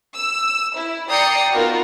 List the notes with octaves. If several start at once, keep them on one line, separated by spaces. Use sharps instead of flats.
E6
E4
D5 G5 A#5 D#6 C7 C#7
B3 D#4 F4 F#4 A#4